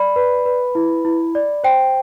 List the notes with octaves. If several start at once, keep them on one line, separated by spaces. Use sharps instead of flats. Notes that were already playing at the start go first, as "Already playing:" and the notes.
Already playing: D5 B5
B4
B4
E4
E4
D5
C5 G5